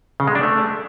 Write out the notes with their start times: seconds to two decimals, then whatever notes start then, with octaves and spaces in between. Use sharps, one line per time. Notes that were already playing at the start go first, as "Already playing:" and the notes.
0.20 C#3
0.28 G#3
0.35 D4
0.43 A3